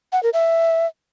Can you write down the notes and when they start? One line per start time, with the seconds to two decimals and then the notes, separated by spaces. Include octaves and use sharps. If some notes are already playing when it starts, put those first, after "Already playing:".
0.13 F#5
0.23 A#4
0.33 E5